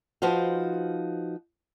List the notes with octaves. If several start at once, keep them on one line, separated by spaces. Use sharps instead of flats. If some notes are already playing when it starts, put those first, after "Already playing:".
F3 D#4 F#4 B4 C5 F5